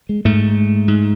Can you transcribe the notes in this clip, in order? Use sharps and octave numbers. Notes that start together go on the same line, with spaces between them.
G#3
G#2 A3
G#2